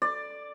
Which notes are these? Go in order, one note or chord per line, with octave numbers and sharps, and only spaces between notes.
D5